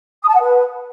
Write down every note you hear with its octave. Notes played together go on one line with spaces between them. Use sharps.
D#6
A5
F#5
B4